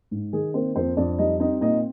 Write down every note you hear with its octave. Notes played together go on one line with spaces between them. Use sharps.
G#2
D#3 G#4
A#3 C4 C5
F2 C4 C5
F2 D4 D5
G3 D#4 D#5
C4 D#4 D#5
A#2 D#4 D#5